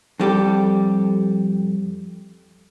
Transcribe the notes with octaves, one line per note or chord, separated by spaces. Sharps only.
F2 G3 G4 A4